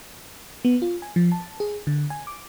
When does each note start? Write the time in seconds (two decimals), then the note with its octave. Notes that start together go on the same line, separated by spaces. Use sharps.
0.65 B3
0.82 F4
1.02 G#5
1.16 F3
1.32 A5
1.60 G#4
1.87 D3
2.10 G#5
2.27 D6